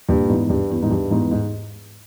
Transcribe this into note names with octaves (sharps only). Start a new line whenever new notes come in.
G2 A#2
E2 G#2
G2
E2
G#2
G2
E2 G#2
G#2